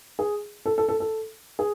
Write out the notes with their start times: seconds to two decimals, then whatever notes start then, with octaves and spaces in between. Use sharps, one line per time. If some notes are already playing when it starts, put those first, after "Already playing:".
0.19 G#4
0.66 A4
0.78 A4
0.89 A4
1.00 A4
1.59 G#4